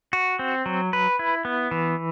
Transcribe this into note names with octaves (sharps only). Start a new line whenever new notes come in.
F#4
C4
F#3
B4
E4
B3
E3